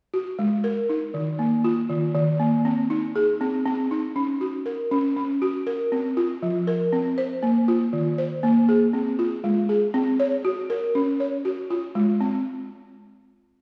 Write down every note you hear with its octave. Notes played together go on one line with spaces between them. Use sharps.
F#4
G#3
A#4
D#4
D#3
A#3
F4
D#3
D#3
A#3
C4
D#4
G#4
C4
C4
D#4
C#4
F#4
A#4
C#4
C#4
F#4
A#4
C4
F4
F3
A#4
C4
C5
A#3
F4
D#3
C5
A#3
G#4
C4
F4
G#3
G#4
C4
C#5
F#4
A#4
C#4
C#5
F#4
F4
G#3
C4